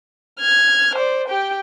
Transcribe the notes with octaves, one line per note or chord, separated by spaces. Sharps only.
F6 G#6
C5 D5
G4 G5